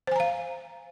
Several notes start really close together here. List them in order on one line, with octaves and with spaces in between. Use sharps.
C5 G#5 A#5 F5